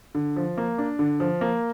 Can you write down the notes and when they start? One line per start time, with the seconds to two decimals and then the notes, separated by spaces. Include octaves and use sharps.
0.15 D3
0.36 F3
0.57 A#3
0.78 D4
0.99 D3
1.20 F3
1.41 A#3